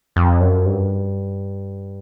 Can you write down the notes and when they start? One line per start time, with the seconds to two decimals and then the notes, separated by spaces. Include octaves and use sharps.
0.16 F2
0.40 F#2
0.66 G2